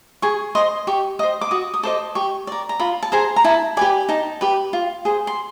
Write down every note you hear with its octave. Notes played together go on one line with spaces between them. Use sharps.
G#4 C#6
C5 D#5 C6
G4 C#6
C5 D#5 D#6
D6
F#4 D#6
D#6
A4 C5 D#5 D6
G4 C#6
A#4 D5
A#5
F4 B5
A5
G#4 C5 A#5
A#5
E4 A5
G4 B4 D5 G#5
D#4 A5
G4 B4
F4
G#4 C5
C6